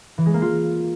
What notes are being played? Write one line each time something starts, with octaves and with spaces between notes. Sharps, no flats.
E3
G#3
A#3
F4